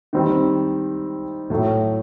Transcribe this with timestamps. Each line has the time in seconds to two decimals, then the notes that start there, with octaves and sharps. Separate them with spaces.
0.13 D#3 G3 C4
1.50 A2 F#3 A3